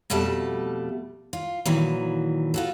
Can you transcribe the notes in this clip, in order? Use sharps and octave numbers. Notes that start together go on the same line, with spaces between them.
F2 B2 G3 A3 A4 A5
F4
A#2 D#3 E3 F#3
F4 F#4 A4